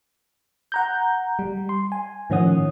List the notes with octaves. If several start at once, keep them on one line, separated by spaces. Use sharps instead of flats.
F#5 A#5 G6
G3
C6
G#5
A2 D#3 F3 C#4 F#5 D#6